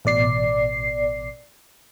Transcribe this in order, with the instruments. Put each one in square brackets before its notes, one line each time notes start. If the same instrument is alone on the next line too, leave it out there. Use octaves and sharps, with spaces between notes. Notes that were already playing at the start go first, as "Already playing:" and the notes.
[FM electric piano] A1 B2 D5 C7